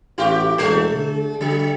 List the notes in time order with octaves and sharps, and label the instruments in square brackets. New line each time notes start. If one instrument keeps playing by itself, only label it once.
[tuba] A1 [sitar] E4 F#4 G4
[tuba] E1 [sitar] G#3
[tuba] D3
[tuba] D3 [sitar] F#3